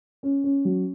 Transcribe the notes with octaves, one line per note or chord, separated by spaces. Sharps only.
C#4
C#4
F#3